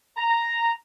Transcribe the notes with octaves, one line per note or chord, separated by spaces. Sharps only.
A#5